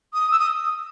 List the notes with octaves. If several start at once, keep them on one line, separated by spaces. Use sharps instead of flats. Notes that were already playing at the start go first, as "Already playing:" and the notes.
D#6
E6
D#6